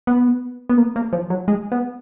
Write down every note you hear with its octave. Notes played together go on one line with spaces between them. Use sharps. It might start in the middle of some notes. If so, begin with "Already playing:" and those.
B3
B3
A#3
A#3
F3
F#3
G#3
B3